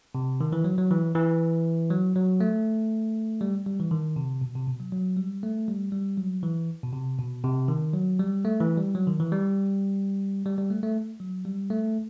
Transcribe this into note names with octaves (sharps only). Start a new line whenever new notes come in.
C3
D#3
E3
F#3
F#3
E3
E3
F#3
F#3
A3
G3
G3
E3
D#3
C3
B2
C3
B2
F#3
F#3
G3
A3
G3
G3
F#3
E3
B2
C3
B2
C3
D#3
F#3
G3
A3
E3
G3
F#3
D#3
E3
G3
G3
G3
A3
A3
F#3
G3
A3